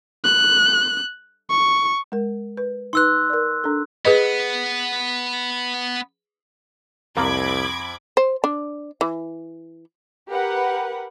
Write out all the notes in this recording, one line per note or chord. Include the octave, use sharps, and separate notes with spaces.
F#6
C#6
G#3 A#4
B4
D#4 B4 C6 E6 F#6
A#4 D5
D4 A4
B3 G#4 B4 D#5
C2 F2 A#3 B5 D6 G#6
C5
D4
E3
G4 A#4 B4 F#5